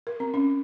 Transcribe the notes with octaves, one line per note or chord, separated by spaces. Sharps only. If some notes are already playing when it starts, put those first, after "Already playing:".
A#4
C4
C#4